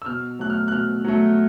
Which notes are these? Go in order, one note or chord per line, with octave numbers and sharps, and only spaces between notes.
E6
B2 F6
F#3 A3 F#6
F6
F#6
B2 F6
F#3 A3